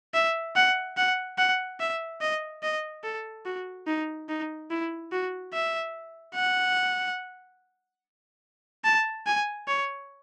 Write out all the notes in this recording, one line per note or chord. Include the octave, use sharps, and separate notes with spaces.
E5
F#5
F#5
F#5
E5
D#5
D#5
A4
F#4
D#4
D#4
E4
F#4
E5
F#5
A5
G#5
C#5